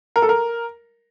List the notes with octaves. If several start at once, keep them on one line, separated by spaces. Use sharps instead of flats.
A#4
A4
A#4